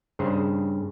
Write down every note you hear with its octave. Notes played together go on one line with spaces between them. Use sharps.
G2 C#3 G#4 C5 A#5